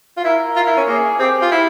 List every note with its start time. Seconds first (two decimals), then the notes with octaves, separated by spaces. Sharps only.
0.17 F4
0.24 E4 A#4
0.56 F4
0.67 E4
0.77 C#4
0.88 A#3 G#4
1.19 C4 G4
1.42 F4
1.51 E4